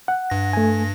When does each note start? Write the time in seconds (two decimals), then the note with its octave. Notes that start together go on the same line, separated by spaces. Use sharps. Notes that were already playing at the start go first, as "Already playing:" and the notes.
0.08 F#5
0.30 G2 A#6
0.53 A3 G#5